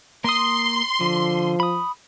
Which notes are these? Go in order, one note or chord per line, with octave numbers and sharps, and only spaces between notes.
A#3 C6 D#6
D3 F3
B5 D#6